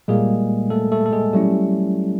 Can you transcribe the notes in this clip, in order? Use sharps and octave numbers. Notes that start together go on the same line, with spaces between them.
A#2 G3 G#3 A#3 G#4
A3 A4
A3 A4
A4
G#3 G#4
F#3 G3 A3 C#4 E4 G4